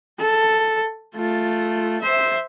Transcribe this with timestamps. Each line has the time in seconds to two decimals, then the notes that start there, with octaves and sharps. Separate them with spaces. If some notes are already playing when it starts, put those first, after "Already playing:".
0.19 A4
1.15 A3 F4
2.02 C5 E5